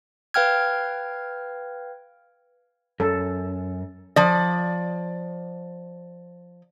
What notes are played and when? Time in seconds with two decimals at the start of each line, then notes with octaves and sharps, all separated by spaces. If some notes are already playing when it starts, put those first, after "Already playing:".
0.34 B4 F5 G5 F6 G#6
3.00 F#2 A4
4.16 F3 D5